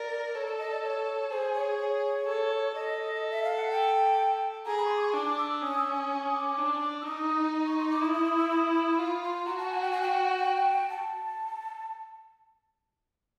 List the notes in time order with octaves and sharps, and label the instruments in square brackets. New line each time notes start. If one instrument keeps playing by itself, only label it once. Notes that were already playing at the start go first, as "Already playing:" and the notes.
Already playing: [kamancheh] A#4 [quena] D5
[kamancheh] A4 [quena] C#5
[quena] D5
D#5
D5
C#5
[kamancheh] G#4 [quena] C5
[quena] C#5
C#5
[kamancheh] A4
[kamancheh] A4 [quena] D#5
[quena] E5
F5
F#5
G5
[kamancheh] G#4 [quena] A#5
[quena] B5
C#6
C6
D6
C#6
[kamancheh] D4 [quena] D6
[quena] E6
E6
[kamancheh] C#4 [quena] D#6
[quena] E6
D#6
D#6
D6
[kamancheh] D4
[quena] E6
[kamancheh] D#4 [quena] D#6
[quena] C#6
C6
D6
[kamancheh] E4 [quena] D#6
[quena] D#6
D#6
E6
D#6
D#6
[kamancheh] F4 [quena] B5
[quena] C6
[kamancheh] F#4 [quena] A#5
[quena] A5
G#5
G5
G#5
G5
A5